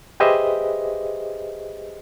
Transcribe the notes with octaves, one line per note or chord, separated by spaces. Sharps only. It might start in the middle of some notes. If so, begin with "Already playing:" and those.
G4 G#4 B4 C5 D#5 E5